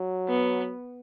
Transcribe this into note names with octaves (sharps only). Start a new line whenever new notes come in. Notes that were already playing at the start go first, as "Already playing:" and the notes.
Already playing: F#3
B3